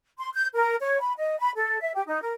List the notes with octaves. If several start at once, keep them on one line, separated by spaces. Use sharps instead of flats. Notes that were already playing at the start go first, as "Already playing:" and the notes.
C6
G6
A#4
C#5
B5
D#5
B5
A4
E5
G4
D#4
A#4